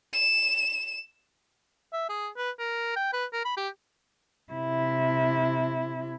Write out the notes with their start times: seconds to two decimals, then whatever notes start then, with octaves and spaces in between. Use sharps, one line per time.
0.13 E7
1.93 E5
2.09 G#4
2.37 B4
2.59 A#4
2.96 G5
3.13 B4
3.33 A#4
3.45 B5
3.57 G4
4.53 C3 E4